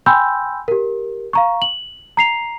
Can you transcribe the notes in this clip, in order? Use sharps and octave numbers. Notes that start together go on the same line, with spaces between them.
G5 G#5 B5 C6 E6 G6
G4 A#4
F5 A#5 C#6
F#7
A#5 C7 F7